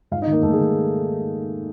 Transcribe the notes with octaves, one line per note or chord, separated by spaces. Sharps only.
G#2 F4 F5
D#4 D#5
D#3
A#3 A#4
G#2 A3 A4
G#3 G#4
D#3